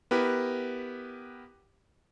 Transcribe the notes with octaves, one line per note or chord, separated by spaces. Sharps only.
B3 E4 G4 A#4 B4